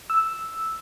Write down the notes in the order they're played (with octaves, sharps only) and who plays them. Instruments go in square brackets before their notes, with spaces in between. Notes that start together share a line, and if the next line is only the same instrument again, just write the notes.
[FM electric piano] E6